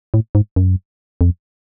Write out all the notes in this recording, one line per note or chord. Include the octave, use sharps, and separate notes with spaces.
A2
G#2
F#2
F2